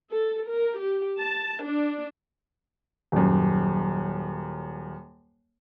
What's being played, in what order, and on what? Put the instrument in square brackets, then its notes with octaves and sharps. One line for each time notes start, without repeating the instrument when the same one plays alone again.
[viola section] A4
A#4
G4
A5
D4
[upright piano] D#1 F#2